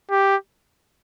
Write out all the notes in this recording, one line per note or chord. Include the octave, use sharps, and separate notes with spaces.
G4